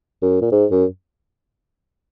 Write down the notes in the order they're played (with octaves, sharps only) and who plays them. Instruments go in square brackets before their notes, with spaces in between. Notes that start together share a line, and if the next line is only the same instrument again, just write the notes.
[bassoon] F#2
A#2
G#2
F#2